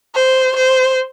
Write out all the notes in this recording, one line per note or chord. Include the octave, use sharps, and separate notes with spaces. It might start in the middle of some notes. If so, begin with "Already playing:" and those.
C5
C5